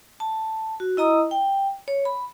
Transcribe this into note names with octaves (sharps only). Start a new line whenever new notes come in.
A5
F#4
E4 D#5 A#5 D#6 E6
G5
C#5
B5